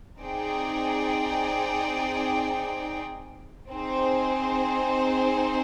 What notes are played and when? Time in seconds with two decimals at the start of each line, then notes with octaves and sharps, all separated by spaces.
0.22 C4 D#4 G#4 D5 G5
3.71 C4 D#4 G#4 C5